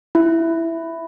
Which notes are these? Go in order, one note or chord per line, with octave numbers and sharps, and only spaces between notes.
E4